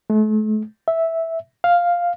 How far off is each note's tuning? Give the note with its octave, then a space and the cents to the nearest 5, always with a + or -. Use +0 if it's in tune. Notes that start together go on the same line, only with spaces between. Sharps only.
A3 -40
E5 -5
F5 +0